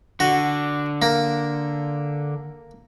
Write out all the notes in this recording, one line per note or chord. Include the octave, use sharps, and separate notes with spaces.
D3 F#4
A#3